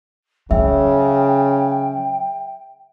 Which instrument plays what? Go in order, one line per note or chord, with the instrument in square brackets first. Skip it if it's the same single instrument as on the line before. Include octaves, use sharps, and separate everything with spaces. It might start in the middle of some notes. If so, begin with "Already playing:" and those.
[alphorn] C#3 [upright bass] F#3 [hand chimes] E5 [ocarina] G5